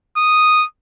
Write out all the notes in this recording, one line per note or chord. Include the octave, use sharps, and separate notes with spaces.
D#6